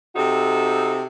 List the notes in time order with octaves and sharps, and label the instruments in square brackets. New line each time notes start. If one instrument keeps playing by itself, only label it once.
[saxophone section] C3 C4 D#4 F#4 A4